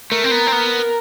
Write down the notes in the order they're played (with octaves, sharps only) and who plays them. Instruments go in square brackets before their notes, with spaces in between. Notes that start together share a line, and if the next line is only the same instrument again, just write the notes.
[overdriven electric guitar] A3 [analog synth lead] A#4
[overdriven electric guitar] C4
B3
C4
B3